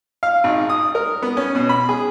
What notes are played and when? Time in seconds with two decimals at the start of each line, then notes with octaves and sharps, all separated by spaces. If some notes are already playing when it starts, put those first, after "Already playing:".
0.23 F5
0.44 G#1
0.70 D#6
0.95 A#4
1.22 B3
1.37 C#4
1.55 B2
1.69 B5
1.89 G#4